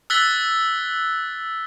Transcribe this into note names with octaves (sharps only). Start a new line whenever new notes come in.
E6 F#6 A6 B6 G7